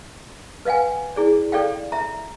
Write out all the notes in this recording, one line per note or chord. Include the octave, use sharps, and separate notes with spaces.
B4 D#5 F5 F#5 G#5
E4 G#4 D5
A4 D5 D#5 F5 G5
E5 A#5